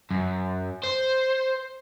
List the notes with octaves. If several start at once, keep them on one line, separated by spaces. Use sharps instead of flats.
F#2
C5